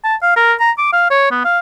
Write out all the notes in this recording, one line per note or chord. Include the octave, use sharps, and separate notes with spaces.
A5
F5
A#4
A#5
D6
F5
C#5
B3
F5